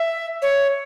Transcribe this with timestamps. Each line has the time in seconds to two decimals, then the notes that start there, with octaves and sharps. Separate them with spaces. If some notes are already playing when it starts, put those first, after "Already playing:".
Already playing: E5
0.42 C#5